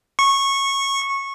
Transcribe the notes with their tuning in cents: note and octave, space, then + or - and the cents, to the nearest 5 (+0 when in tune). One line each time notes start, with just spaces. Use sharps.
C#6 -15